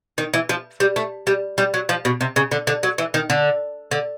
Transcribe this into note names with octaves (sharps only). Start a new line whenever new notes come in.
D#3
E3
F3
G3
A3
G3
G3
F#3
F3
B2
C3
C#3
D3
D3
F#3
E3
D#3
D3
D3